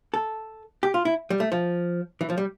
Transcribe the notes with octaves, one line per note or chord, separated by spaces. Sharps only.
A4
G4
F4
E4
G3
A3
F3
E3
F3
G3